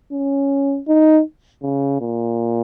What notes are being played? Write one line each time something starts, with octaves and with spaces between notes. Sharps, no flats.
C#4
D#4
C#3
A#2